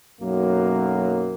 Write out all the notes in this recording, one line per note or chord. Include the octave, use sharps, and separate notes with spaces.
B1 F#2 F#3 A#3